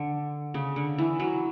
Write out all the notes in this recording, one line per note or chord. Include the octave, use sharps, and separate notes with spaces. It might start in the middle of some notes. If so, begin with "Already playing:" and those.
Already playing: D3
C#3
D3
E3
F#3